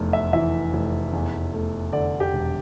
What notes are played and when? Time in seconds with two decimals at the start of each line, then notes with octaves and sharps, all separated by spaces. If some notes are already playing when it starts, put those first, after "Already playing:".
Already playing: F1 E2
0.13 E5
0.33 E3 E5
0.73 F1
1.13 E2
1.53 A3
1.93 D3 D5
2.20 G4
2.33 E1